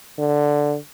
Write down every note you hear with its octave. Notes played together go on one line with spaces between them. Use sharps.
D3